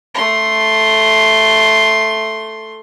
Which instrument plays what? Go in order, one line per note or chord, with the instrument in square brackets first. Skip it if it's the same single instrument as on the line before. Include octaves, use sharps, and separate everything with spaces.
[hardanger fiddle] A3 C6